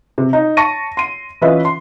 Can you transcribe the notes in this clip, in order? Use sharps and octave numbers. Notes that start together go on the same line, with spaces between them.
C3
D#4
A5 C#6 A#6 D#7
C6 D#7
E3 C#4 F4 B4 D#5 E5
C6